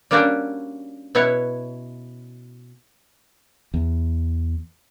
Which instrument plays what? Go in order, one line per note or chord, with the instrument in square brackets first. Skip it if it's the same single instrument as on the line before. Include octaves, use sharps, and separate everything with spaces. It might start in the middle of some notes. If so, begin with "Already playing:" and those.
[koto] G3 A#3 C#4 D4 F#4 G4
B2 B3 E4 C#5
[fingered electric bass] E2